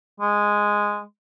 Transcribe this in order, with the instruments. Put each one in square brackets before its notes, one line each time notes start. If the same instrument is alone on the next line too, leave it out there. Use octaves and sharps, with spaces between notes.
[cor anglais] G#3